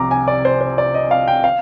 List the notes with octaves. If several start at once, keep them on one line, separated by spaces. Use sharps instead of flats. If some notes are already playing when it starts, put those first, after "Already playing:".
Already playing: C2 C3 F3 A#5 D6
G#5
D5
C5
C5
D5
D#5
F5
G5
F5